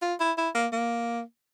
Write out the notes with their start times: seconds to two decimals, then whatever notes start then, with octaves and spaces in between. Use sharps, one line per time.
0.02 F4
0.20 E4
0.38 E4
0.55 A#3
0.72 A#3